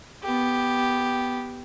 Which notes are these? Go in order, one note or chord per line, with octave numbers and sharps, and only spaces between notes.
B3 G4